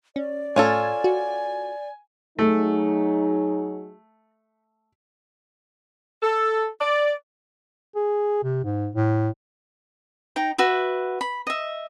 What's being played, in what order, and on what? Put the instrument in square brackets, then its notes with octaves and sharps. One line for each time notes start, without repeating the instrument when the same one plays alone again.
[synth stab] C#4 [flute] D5
[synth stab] A2 G#6 [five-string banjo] C#4 F4 A4 [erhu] G#5
[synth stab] F#4
[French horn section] F#3 D#4 G#4 [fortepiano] A3
[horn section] A4
D5
[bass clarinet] G#4
C3
G#2
A2
[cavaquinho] D#4 G5 A#5
F#4 B4 E5
B5
D#5 E5